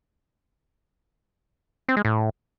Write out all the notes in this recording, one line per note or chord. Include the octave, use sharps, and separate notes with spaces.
C4
G#3
A2